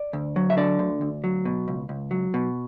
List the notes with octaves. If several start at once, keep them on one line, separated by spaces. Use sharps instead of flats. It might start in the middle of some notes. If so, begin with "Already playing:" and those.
Already playing: D5
D2
F#3
E5
D3 D5
D2
D2
F#3
B2
C#2
C#2
F#3
B2